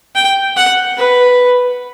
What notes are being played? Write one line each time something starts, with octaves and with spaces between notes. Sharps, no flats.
G5
F#5
B4